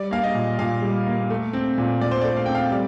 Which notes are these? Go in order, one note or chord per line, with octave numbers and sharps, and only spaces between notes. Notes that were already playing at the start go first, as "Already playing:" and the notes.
Already playing: G3 D5
A#3 F5
D#5
A#2
A#2 F5
G3
A#3
A3
C4
A#2
A#2 D5
C5
D5
A3
F5
C4 G5
F5
G3 D5